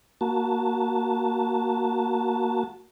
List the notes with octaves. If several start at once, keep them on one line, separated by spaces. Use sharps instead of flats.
A#3 F#4 A5